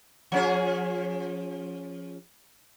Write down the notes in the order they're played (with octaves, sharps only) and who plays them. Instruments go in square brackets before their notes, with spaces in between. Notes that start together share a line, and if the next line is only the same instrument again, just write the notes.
[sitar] F3 C#4 G#4